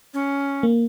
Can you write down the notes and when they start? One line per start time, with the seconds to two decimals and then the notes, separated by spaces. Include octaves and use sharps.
0.14 C#4
0.63 A#3